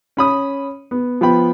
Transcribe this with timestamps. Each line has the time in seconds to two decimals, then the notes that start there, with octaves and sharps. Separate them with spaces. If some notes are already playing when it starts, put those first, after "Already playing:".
0.17 C#4 B5 D#6
0.91 B3
1.21 F3 B3 G5 B5